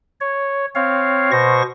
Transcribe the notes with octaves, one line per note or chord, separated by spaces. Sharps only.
C#5
C4 C#5 F5
B2 C5 C#6 A#6